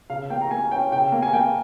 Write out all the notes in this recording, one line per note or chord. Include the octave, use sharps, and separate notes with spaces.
C#3 F5
A#3 G5
A#5
A#3 G#5
C#4 G5
C#3 G5
A#3
G#5
A#3 G5